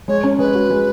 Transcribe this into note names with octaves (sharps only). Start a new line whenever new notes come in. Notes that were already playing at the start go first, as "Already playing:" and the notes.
G#3 C#5
C#4
G#3 B4
F#4
G#3